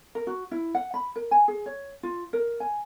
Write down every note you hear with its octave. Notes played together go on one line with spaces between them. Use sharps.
A#4
F#4
E4
F#5
B5
A#4
G#5
G#4
C#5
F4
A#4
G#5